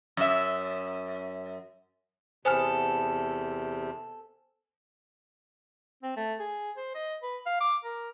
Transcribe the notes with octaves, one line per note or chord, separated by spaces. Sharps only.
F#2 E5
E2 C3 B3 A4 C5 G#5 F6
C4
A3
G#4
C5
D#5
B4
F5
D6
A#4